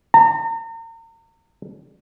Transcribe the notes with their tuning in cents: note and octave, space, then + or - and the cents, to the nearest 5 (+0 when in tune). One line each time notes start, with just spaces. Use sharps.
A#5 -40